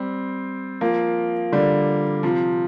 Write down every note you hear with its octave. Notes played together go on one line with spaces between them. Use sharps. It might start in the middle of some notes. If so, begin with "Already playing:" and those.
Already playing: G3 C4
F3 A#3
D3 G3
C3 F3